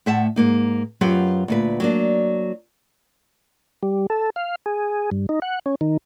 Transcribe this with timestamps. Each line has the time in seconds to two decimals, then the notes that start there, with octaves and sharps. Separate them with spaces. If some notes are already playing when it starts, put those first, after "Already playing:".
0.06 A2 C5 E5 F#5 A5
0.36 G#2 A#3 D#4
1.01 F#2 F#3 F4 G4 B4 F5
1.48 D2 A#2 B4
1.80 F#3 A#3 D4
3.83 G3
4.10 A4
4.36 F5
4.66 G#4
5.11 G2
5.29 D#4
5.42 F#5
5.66 C#4
5.81 D#3